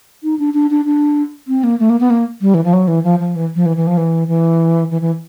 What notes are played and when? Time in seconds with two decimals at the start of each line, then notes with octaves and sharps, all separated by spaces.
0.24 D#4
0.39 D4
0.54 D4
0.71 D4
0.85 D4
1.48 C4
1.64 A#3
1.80 A3
1.90 A#3
2.00 B3
2.10 A#3
2.41 G3
2.54 E3
2.64 F3
2.73 F#3
2.88 E3
3.04 F3
3.19 F3
3.36 E3
3.55 F3
3.66 E3
3.77 E3
3.87 F3
3.97 E3
4.28 E3
4.91 E3
5.02 E3